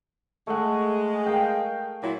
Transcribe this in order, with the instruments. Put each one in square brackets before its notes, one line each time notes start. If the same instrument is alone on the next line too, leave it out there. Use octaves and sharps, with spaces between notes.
[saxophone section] G#3 [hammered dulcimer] A3 F#5
[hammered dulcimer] A#4 F5 G5
[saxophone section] A#2 F#3 E4